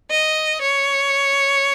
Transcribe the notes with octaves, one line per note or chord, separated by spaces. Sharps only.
D#5
C#5